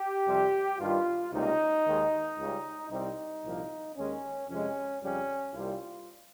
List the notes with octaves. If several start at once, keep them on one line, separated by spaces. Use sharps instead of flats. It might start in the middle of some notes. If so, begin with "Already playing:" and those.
Already playing: G4
F2 C3 G3
G2 D#3 G3 F4
C#2 C3 G3 A#3 D#4
D#2 D#3 G#3
C#2 C#3 G3
C2 C3 G3 C4 D#4
C2 A#2 F3 A#3
D#2 D#3 G#3 C#4
F2 C3 F3 G#3 C#4
F2 C#3 G3 C#4
C2 C3 G3 A#3 F4